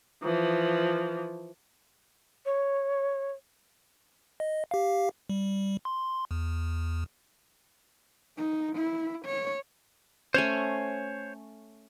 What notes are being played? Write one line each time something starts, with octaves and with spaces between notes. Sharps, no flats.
E3 F3
C#5
D#5
G4 F5
G3
C6
E2
D#4
E4
C#5
A3 C#4 C5 C#5 G#5